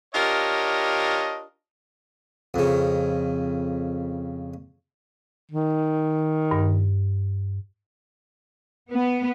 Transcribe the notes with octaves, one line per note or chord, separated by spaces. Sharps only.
D4 F4 G4 A#4 C#5 D#5
F2 C#3
D#3
G2
B3